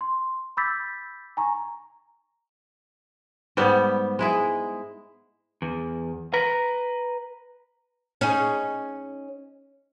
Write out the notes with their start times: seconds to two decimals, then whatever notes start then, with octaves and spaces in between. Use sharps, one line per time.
0.01 C6
0.57 B5 D6 E6 G6 A6 B6
1.37 G#5 A#5 C#6
3.57 G#2 G3 B3
4.19 G#3 E4 G#4
5.62 E2
6.34 B4 A#5
8.21 C#4 D#4 G#4